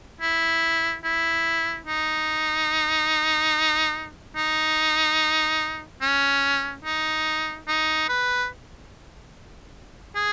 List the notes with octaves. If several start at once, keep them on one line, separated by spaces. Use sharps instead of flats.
E4
E4
D#4
D#4
C#4
D#4
D#4
B4
G#4